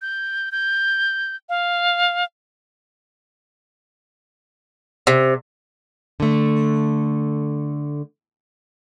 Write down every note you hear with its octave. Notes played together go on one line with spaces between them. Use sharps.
G6
G6
F5
C3
D3 A3